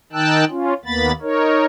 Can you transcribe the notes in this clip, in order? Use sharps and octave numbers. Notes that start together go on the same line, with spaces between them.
D#3 D#4 G5 A5 E6 F#6
C#4 F4
D#2 A#3 B3 B5 A6
D#4 A#4 C#5